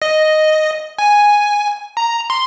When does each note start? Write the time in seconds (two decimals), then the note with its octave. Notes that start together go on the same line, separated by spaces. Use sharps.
0.02 D#5
0.99 G#5
1.97 A#5
2.30 C6